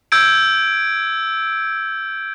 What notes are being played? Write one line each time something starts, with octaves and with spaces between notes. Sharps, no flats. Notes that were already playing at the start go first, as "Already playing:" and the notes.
E6 G6 G#6 D7